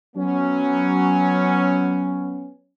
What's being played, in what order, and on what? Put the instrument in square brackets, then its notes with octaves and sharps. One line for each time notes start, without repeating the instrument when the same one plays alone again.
[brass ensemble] F#3 B3 C#4